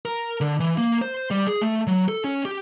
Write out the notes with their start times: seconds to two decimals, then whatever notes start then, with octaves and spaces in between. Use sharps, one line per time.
0.05 A#4
0.41 D3
0.60 E3
0.77 A#3
1.02 C5
1.31 G3
1.47 G#4
1.61 A3
1.87 F#3
2.08 A4
2.24 C#4
2.45 G4